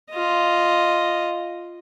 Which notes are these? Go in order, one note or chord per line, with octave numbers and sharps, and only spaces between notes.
F4 D#5